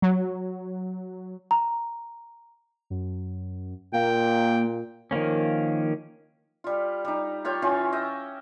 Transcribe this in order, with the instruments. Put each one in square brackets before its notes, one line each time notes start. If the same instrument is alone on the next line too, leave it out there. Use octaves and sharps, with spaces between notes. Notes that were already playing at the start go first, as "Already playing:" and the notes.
[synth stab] F#3
[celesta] A#5
[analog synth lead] F#2
[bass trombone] A#2 [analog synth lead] A#3 [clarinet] G5
[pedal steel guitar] D#3 F3 A#3 C#4
[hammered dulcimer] G3 F4
G3 D#4
F4 G4 C#5 G5
E3 C#4 F4
D#5 E5 G5